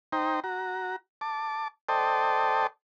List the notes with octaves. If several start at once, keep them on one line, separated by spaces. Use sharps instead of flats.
D#4 C5 G5 A#5
F#4 A#5
A5 D6
A4 C5 D5 D#5 G5 A5